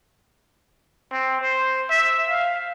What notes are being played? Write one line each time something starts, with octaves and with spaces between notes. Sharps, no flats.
C4
C5
E5
F5